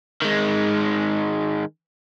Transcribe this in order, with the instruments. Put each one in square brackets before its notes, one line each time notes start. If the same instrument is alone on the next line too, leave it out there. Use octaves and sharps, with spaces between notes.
[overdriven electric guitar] D#3 G#3